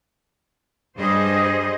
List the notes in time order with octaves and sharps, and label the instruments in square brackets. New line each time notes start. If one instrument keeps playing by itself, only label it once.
[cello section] G2 G3 G#4 C5 D#5